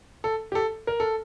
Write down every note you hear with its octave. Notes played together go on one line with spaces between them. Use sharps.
A4
G4
A4
A#4
A4